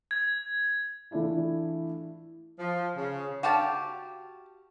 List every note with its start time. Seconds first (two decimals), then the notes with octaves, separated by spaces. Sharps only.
0.11 G#6
1.11 E3 A3 D4 E4 F4
2.59 F3
2.97 C#3
3.43 F#4 G4 F5 A5